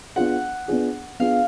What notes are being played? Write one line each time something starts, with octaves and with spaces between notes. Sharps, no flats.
B3 D4 F4 G#4 F#5
B3 D4 F4 G#4
B3 D4 F4 G#4 F5